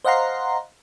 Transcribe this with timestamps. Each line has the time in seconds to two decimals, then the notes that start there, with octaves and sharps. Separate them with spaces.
0.05 C5 D#5 F5 F#5 A#5 C6